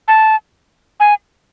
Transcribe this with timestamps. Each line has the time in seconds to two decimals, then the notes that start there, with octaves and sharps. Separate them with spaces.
0.08 A5
1.00 G#5